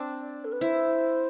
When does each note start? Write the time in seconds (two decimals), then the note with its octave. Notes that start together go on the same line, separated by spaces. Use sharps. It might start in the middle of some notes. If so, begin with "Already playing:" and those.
Already playing: C4 D4
0.22 D5
0.44 A4
0.52 B4
0.61 E4 C5